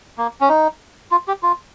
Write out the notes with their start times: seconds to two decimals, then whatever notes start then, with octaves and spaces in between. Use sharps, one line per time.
0.18 A#3
0.41 C#4
0.49 D#4
1.11 F4
1.28 G4
1.43 F4